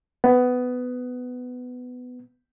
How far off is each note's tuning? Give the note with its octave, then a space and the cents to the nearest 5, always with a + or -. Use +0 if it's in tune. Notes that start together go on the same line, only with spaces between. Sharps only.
B3 +15